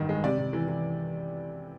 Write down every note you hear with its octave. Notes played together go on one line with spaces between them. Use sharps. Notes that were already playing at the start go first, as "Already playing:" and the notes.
Already playing: A1 G2 D#3
G#3
C3 D5
C3
E3
E3